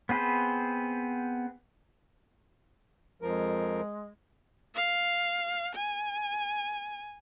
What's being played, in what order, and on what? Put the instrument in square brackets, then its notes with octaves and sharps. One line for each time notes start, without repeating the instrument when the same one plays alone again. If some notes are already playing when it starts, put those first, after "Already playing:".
[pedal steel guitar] B3 C4 G#4 B4 C5
[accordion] F2 F3 A#4 [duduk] G#3
[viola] F5
G#5